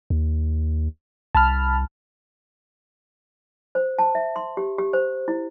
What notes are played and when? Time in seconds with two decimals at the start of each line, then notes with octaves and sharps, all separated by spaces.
0.10 D#2
1.35 C2 A5 B5 F6
3.75 C5
3.99 A5
4.15 E5
4.36 C6
4.57 G4
4.79 G4
4.93 C5
5.28 E4